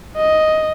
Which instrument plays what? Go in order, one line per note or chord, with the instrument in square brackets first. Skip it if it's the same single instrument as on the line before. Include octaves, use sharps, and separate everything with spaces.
[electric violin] D#5